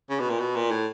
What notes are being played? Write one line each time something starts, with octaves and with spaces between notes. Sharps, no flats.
C#3
B2
A#2
B2
A#2
A2